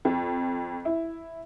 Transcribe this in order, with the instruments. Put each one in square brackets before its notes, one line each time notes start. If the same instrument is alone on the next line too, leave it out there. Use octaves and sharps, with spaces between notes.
[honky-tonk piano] F2
E4